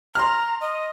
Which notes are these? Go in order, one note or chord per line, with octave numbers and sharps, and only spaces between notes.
A#5 C6 F6
D#5